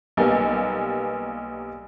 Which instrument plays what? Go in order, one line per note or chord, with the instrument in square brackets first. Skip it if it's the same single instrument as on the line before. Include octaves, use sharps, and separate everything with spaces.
[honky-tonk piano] B1 G3 A#3 B3 G#5